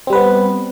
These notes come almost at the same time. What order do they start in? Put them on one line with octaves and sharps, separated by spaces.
C4 G3 B4 B3